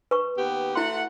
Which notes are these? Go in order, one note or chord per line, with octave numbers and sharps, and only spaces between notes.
B4 C#6
D#2 B3 G4
A3 E4 F#4 F#5 C6